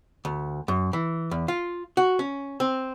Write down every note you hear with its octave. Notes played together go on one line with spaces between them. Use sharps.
D2
F#2
E3
E2
F4
F#4
C#4
C4